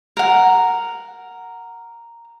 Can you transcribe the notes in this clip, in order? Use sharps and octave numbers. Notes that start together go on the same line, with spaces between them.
A#4 F#5